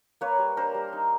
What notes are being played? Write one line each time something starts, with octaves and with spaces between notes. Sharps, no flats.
A#3 B4 C#5
G3
D4 A#4 C5
G3
D#4